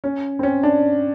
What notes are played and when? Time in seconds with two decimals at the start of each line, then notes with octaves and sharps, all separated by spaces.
0.04 C#4
0.39 C4
0.43 C#4
0.63 D4